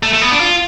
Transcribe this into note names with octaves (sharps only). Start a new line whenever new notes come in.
A3
A3
B3
D4
F4